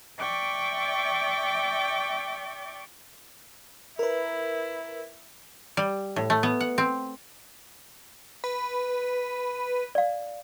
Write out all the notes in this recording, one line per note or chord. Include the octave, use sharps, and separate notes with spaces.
D5 E5 G5 C#6 D6
E4 A#4 B4
G3
A2
A3
B3
F#5
C4
B4
D5 F5